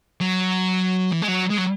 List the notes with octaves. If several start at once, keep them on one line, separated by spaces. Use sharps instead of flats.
F#3
E3
G#3
F#3
G#3
F#3